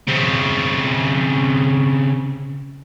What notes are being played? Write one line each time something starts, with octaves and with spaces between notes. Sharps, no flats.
C#3 C4